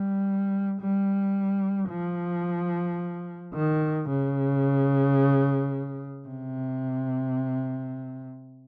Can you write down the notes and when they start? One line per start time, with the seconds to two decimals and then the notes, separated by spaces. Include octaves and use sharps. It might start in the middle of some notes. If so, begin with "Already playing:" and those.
Already playing: G3
0.81 G3
1.90 F3
3.54 D#3
4.09 C#3
6.28 C3